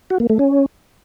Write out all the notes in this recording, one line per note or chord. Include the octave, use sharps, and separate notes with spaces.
F#4
A#3
A3
C#4